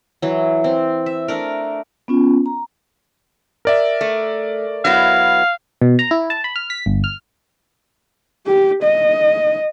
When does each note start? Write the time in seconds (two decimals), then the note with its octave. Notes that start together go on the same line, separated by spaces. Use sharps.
0.22 E3 F#3
0.64 C4
1.06 E5
1.28 A3 D4 A#4
2.08 B3 C#4 F4
2.46 A#5
3.65 A#4 D5 E5
4.01 A3
4.85 F#3 B3 E4 F5
5.81 B2
5.99 A#5
6.11 E4
6.30 A5
6.44 B5
6.56 F6
6.70 B6
6.86 G1
7.04 F6
8.46 G4
8.83 D#5